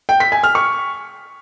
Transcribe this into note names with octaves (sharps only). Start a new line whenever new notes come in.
G5
B6
G#5
F6
C#6